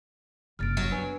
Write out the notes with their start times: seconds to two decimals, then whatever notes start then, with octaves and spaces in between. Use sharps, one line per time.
0.59 F#1 C2 F6 A6 D7
0.77 F#3
0.92 B3 D4 B4 G#5